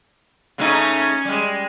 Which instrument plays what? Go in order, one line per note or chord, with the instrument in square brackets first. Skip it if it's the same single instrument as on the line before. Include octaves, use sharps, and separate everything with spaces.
[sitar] C#3 A3 D#4 [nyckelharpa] C#4 G#5
[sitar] G3 G#3